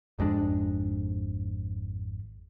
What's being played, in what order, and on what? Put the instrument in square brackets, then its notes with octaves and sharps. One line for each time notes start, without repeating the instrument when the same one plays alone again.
[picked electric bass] G#1 F2 G#3 D4